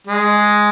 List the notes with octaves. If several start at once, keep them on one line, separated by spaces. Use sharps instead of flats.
G#3